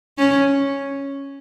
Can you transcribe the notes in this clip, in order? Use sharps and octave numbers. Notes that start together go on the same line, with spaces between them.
C#4